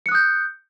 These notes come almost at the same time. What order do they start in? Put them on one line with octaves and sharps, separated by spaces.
C#7 F#6 D#6 G6